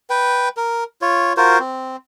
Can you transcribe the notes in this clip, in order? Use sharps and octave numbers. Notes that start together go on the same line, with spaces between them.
B4 G5
A#4
F4 C#5
F4 F#4 A#4 C5
C4